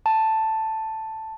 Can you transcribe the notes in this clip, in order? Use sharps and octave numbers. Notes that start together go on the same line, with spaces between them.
A5